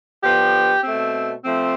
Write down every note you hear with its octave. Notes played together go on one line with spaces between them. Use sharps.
D3 F3 B3 G4
B2 A3 C4
F3 A3 C4